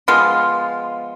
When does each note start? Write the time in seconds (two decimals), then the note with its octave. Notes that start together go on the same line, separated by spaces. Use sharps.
0.08 F3 G#3 B3 F4